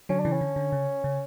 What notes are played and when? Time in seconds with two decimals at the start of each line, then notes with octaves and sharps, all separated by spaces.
0.09 D3 F#3 C#4
0.20 C#3 E3 D4
0.33 C#4
0.41 D3
0.56 D3
0.72 C#3
1.04 C#3